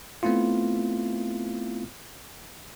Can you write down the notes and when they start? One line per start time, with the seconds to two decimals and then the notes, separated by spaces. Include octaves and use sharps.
0.23 A3 B3 C4 E4 F4